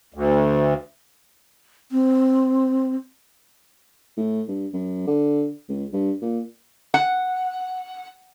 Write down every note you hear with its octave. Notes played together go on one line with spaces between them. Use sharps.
D2
C4
A2
G2
F#2
D3
C#2
G2
A#2
F#5